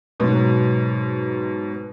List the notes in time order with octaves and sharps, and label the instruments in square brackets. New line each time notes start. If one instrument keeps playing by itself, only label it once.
[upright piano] G#2 B2 F#3